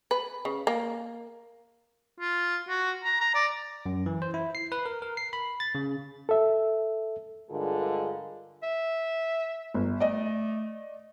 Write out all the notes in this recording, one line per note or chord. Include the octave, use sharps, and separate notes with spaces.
B4
C#3
A#3
F4
F#4
A#5
A#5
D5
F#2
E3
C5
E4
C7
B4
A#4
A#4
C7
B5
A6
C#3
A4 E5
G2 D3 G#3 F4 G#4 A#4
E5
G1
A3 D5 D#5